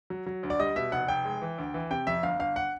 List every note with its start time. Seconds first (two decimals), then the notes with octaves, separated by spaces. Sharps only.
0.10 F#3
0.26 F#3
0.43 D2
0.50 D5
0.60 G3 D#5
0.76 B2 E5
0.92 F1 F#5
1.08 F1 G5
1.25 G#3
1.42 E3
1.58 D2
1.74 E3
1.90 C3 G5
2.07 F2 E5
2.23 G1 F5
2.39 G1 F5
2.56 F#5